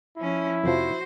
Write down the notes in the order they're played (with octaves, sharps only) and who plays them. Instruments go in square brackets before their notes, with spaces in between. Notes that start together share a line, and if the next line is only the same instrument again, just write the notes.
[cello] F3 C#4 [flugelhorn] E4
[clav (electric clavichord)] F2 C3 F3 [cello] F#4 C5